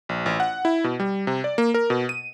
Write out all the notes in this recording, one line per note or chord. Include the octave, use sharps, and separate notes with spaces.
A#1
A1
F#5
E4
B2
G3
C3
D5
A#3
A#4
B2
D#7